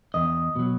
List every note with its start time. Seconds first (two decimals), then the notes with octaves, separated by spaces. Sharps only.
0.14 E2 D#5
0.56 B2 F#3